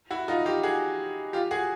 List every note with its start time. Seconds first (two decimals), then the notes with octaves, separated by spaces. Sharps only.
0.10 E4 F#4
0.28 D#4 F4
0.46 F4 G4
0.63 F#4 G#4
1.33 F4 G4
1.51 F#4 G#4